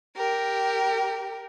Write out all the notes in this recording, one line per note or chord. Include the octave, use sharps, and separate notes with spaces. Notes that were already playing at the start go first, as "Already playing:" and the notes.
G4 A#4